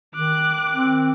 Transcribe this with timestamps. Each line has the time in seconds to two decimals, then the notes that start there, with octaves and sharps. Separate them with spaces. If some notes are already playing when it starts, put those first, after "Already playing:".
0.15 D#3 D6 F#6
0.74 C4